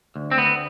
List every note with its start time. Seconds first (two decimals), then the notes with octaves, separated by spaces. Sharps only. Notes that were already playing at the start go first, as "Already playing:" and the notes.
0.16 D2
0.31 C4
0.38 D2 B3